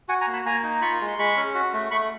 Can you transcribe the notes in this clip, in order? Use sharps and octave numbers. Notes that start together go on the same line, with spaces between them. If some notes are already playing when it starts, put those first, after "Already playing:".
F#4 F#5 G#5
G#5 A#5
A#3
A5 B5
A#3 G#5 A#5
D#4
F4 B5 C#6
G#3
C6
G#3 B5 C#6
C#4
F#4
A3
A3 B5 C#6